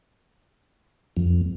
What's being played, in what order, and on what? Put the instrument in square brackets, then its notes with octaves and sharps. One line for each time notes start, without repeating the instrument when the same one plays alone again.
[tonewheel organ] F2